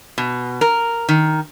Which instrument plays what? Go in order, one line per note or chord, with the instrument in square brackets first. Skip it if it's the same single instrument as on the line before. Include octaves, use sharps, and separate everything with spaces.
[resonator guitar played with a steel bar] B2
A#4
D#3